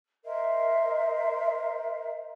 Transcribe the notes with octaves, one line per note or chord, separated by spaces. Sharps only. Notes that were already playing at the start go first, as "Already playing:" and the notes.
A#4 C5 D#5 E5